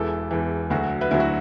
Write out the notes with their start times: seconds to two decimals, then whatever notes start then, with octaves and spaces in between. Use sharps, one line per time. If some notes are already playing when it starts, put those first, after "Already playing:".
Already playing: E1 E2 E3 E4 A4
0.31 E1 E2 E3
0.70 D2 D3 F#3 F#4
1.01 B4 E5
1.11 D2 D3 F#3 E4
1.20 F#4